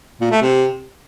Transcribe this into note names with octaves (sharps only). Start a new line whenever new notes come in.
A#2
A3
C3